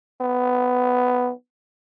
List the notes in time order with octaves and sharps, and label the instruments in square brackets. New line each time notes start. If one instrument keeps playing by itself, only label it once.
[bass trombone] B3